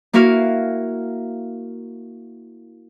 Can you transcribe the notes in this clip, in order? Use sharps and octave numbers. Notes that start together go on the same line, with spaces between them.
A#3 E4 F#4 A#4 F5